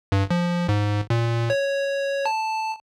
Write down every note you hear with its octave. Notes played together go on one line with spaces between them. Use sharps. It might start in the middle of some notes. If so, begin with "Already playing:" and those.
G2
F3
G#2
A#2
C#5
A5